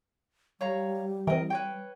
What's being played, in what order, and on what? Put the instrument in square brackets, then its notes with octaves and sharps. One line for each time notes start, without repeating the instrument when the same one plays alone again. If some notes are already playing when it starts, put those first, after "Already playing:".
[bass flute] G3 [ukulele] C#5 F5 A#5
[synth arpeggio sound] E3 C4 [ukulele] A#4 D#5
[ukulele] B4 C#5 G5